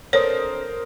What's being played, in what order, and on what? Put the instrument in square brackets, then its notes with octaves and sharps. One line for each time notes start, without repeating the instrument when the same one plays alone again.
[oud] C4 D4 A4 [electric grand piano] A#4 C5 D#6 [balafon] C#5